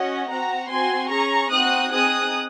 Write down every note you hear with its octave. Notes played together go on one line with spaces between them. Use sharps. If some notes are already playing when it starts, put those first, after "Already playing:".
Already playing: C#4 F#4 D#5 F#5
C4 F#4 F#5 A#5
C4 F#4 G#5 C6
C#4 G#4 A#5 C#6
C4 D#4 F#4 D#6 F#6
C4 D#4 G#4 D#6 F#6